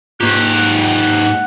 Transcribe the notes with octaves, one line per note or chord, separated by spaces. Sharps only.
G#2 A#3 F4 G4 F#6
F#5